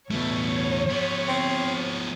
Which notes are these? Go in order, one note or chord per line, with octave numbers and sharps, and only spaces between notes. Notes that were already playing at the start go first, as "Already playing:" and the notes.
E2 B2 A3 C#5
F3 B3
C4